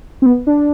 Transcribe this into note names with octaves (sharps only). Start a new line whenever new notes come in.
C4
B3
D4